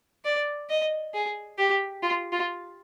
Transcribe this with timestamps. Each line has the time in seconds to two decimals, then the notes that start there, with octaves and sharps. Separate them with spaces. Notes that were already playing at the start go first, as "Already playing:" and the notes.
0.25 D5
0.69 D#5
1.14 G#4
1.58 G4
2.02 F4
2.32 F4